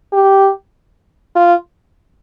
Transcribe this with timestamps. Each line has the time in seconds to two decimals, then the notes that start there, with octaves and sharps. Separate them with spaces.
0.13 G4
1.36 F4